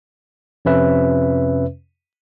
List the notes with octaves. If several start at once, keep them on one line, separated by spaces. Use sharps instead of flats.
F2 C3 C#4 B4 E5